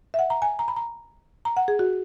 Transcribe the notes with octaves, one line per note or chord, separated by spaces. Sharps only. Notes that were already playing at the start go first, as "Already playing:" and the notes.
E5
F#5
A#5
G#5
A#5
B5
A#5
A#5
F#5
G#4
F#4